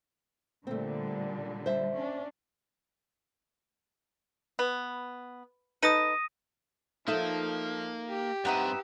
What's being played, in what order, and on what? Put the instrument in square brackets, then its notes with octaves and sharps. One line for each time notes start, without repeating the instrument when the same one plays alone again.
[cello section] A#2 D3 G3 [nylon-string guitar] A3 C4
[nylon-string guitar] C5 E5
[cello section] C#4 D4
[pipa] B3
[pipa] D#4 A4 B4 [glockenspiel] D#6 A#6 D#7
[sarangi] F3 [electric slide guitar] A#3 [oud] D#4 A4 E5
[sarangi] G4
[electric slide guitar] G2 C4 F#5 [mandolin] B3 D#4 E5